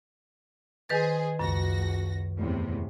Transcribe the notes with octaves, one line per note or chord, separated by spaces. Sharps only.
D#3 G#4 B4 C5 A6
C#2 F#2 F#4 A#6
E2 A2 C3